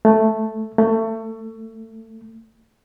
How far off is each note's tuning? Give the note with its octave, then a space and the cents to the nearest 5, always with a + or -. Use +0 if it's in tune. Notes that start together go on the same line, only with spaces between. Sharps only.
A3 +0
A3 +25